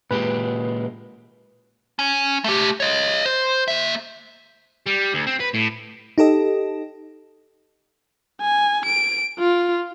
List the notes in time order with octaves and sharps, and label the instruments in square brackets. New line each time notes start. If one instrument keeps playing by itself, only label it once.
[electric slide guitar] A#2 G#3 G4 [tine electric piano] B4
[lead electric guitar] C#4
A3 G4
C#5 D#5
C5
A#3 E5
[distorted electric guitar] G3
D2
C4
B4
A2
[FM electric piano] D#4 G4 A4 D#5
[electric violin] G#5
D7
F4